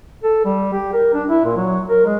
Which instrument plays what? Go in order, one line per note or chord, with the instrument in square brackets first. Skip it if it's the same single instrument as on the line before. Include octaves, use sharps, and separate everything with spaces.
[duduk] A4
G3
G4
A#4
D4
E4
A#2
F#3
A#4
G#3